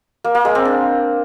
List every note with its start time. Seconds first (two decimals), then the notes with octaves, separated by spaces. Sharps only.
0.24 A#3
0.35 A#3
0.45 G#3
0.55 C4
0.65 D4